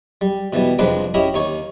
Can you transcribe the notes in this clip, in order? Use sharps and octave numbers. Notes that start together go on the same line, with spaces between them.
G3
B2 E3 G3 B3
C2 F2 G#3 D4 B4 G5
C#4 E4 G4 D#5 B5
D#2 D#4 C#5 C#6